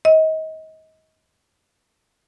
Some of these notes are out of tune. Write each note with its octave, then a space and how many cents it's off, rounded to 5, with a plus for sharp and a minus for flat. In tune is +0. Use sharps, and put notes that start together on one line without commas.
D#5 +30